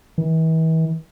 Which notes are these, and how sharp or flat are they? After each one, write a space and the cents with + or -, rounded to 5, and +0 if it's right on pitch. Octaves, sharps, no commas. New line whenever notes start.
E3 -40